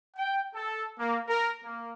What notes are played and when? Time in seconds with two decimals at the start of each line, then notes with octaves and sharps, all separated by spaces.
0.16 G5
0.53 A4
0.99 A#3
1.28 A#4
1.63 A#3